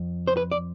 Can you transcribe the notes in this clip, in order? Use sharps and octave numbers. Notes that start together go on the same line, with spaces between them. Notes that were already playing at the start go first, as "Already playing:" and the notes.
Already playing: F2
C5
B4
D5